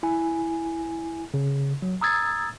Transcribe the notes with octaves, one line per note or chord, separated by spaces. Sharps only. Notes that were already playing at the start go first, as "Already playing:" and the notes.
E4 G#5
C#3
F#3
A#5 D#6 E6 G#6 A6